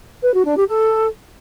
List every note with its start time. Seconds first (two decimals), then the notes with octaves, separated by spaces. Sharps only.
0.23 B4
0.34 F#4
0.45 D4
0.56 G4
0.68 A4